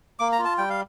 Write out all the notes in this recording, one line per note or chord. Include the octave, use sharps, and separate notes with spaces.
A#3 D6
A#5
F4
A5
G3 G5
F5